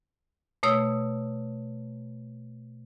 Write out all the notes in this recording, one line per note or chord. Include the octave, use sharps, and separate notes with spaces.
B2 A3 C#5 D#6 E6